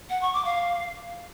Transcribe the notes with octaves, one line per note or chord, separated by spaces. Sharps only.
F#5
C#6
D6
F5